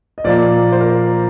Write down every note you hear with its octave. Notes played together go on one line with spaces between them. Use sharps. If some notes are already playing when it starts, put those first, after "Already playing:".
D#5
A#2 F3 A#3 D5
C5
A#4
C5